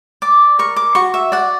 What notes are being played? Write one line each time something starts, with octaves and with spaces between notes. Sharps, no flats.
D5 D6
A#4 C#6
D6
F#4 C#6
E5
D5 F#5